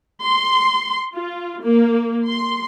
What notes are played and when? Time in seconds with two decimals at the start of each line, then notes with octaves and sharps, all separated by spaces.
0.23 C6
1.14 F4
1.64 A#3
2.29 C6